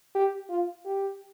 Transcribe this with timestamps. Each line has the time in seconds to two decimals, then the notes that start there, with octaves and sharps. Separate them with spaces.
0.15 G4
0.50 F4
0.86 G4